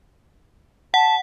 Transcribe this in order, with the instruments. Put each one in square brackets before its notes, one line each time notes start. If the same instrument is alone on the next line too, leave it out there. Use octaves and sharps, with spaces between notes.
[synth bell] F#5 [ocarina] A5